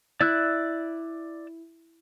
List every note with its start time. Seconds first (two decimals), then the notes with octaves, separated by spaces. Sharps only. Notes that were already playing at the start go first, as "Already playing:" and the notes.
0.21 E4 D5 E6 F#6